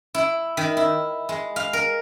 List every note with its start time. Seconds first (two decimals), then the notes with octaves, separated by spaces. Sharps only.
0.15 E4
0.57 D#3
0.77 E4
1.29 G#3
1.56 F5
1.73 A#4